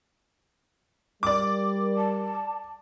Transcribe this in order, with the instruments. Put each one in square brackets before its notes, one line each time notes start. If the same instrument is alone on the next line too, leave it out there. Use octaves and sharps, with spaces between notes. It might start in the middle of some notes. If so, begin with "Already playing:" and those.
[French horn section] G3 A#4 [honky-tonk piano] D5 D6
[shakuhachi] A5